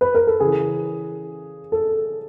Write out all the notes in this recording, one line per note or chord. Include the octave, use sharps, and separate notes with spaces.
B4
A#4
A4
C#3 E3 G#4
A4